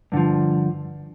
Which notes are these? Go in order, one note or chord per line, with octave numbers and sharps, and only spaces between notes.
G2 D3 F3